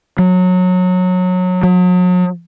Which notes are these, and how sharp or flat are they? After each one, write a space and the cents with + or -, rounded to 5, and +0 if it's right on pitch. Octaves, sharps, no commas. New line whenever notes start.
F#3 -20
F#3 -40